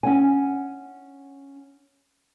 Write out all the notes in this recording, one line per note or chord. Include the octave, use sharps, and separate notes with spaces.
C#4 F#5 G#5